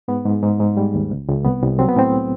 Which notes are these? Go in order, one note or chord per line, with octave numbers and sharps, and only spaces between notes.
G#2 B3
G#2
G#2
G#2
G3
D#2
C#2
C#2
C2 B3
C2
F#3 C4
B3
A2 C4